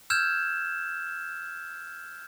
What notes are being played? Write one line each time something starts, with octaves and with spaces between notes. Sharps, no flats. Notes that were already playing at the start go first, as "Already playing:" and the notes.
E6 F6 G6 G#6 E7